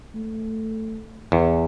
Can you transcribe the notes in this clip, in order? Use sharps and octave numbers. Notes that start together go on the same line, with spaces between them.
A3
E2